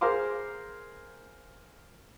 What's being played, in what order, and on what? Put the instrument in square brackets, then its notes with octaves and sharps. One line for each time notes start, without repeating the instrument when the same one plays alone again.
[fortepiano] G#4 A#4 C5 F5 C6 D6